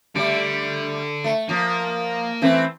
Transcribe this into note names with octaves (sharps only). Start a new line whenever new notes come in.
D3 G3 A3 D5
A3
F3 A#3
E3 A3 C4